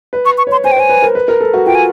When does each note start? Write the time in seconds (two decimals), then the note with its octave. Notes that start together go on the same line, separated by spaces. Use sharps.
0.13 B4
0.26 C#6
0.38 C#6
0.47 C#5 C6
0.64 C5 G#5
0.72 G5
0.76 C5 G#5
0.89 B4
1.02 A#4
1.15 B4
1.28 A#4
1.41 A4
1.54 F#4
1.66 F4 G5
1.75 G#5